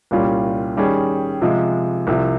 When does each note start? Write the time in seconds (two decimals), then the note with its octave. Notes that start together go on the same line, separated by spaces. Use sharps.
0.11 C2 A#2 G3 C#4 F4
0.77 D#3 G3 C#4 G#4
1.42 C3 F3 G#3
2.07 C2 C3 F3